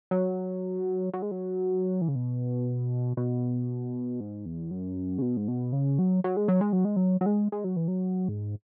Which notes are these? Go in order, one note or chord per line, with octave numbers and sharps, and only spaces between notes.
F#3
F#3
G#3
F#3
E3
C#3
B2
B2
G#2
E2
F#2
C#3
B2
G#2
B2
C#3
F#3
F#3
G#3
F#3
G#3
F#3
G#3
F#3
F#3
G#3
G#3
F#3
E3
F#3
G#2